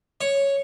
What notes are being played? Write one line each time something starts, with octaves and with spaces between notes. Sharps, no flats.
C#5